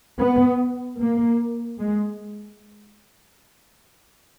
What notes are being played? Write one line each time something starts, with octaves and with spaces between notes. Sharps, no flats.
B3
A#3
G#3